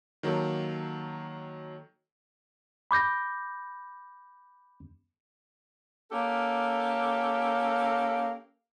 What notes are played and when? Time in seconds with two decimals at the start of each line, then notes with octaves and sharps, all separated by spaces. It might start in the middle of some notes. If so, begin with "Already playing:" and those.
0.23 D#3 F#3 A#3 G4 A4
2.91 B5 D6 G6 A#6
6.12 A#3 C#4 G4 A4